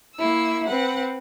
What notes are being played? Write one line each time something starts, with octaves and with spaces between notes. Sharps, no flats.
A#3 E4 E6
C4 B4 F#5